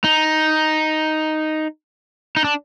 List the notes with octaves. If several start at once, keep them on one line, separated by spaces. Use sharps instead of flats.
D#4
D#4
D4